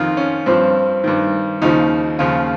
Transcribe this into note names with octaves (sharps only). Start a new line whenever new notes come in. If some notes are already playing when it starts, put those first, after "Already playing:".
Already playing: F2 D#3 F4
C#4
G2 F3 C4
G2 D#3
D#2 C#3 F3 D#4
D#2 C#3 F3 F4